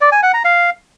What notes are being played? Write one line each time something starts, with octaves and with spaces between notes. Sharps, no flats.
D5
G#5
F#5
A#5
F5